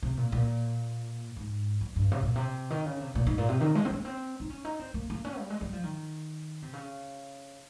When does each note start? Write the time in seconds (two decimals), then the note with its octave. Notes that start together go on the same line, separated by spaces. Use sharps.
0.03 C3
0.17 A#2
0.32 A#2
1.36 G#2
1.81 G2
1.96 G2
2.12 C3
2.23 A#2
2.35 C3
2.70 D#3
2.85 C#3
3.00 C3
3.15 A#2
3.27 G#2
3.38 A#2
3.49 C3
3.61 D#3
3.75 G#3
3.85 C4
3.90 A#3
4.05 C4
4.40 D#4
4.50 C#4
4.65 D#4
4.80 C4
4.94 A#3
5.10 A#3
5.25 C#4
5.39 G3
5.50 G#3
5.61 G3
5.73 F3
5.83 D#3
6.62 C3
6.73 C#3